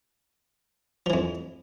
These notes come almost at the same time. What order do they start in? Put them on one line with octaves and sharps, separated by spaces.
F3 E3 F2